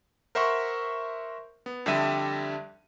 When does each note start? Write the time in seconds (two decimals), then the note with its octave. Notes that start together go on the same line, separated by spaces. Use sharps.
0.35 A#4 C5 E5 F#5 C6 C#6
1.66 B3
1.86 F2 D3 G3 G4 E5 D#7